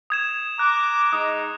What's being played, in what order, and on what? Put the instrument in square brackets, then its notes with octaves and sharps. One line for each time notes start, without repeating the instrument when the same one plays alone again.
[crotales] D#6 G#6 E7
[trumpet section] A#5 D6 [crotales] F#6
[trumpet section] G#3 D#4 [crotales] D#6